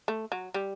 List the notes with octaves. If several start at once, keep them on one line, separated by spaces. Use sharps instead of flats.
A3
F#3
G3